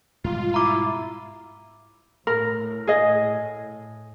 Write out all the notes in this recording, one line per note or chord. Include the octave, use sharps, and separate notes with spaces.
G#2 B2 G3 F4
E4 A#5 D6
A2 A#4
G#4 D#5